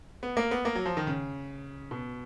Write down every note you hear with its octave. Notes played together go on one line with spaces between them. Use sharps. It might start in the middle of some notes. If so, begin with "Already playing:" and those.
B3
A#3
B3
A#3
F#3
F3
D#3
C#3
B2